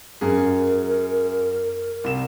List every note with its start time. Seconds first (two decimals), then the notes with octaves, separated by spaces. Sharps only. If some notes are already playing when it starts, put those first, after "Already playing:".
0.21 F#2 G#4 A#4
2.04 C2 E7